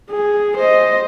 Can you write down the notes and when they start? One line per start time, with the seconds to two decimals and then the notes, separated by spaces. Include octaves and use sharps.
0.10 G#4
0.58 C5 D#5